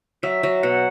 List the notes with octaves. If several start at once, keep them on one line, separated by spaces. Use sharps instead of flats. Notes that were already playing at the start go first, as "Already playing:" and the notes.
F#3 E5
F#3
B2 F#5